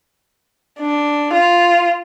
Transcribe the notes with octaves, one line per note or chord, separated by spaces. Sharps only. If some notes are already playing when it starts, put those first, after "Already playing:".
D4
F4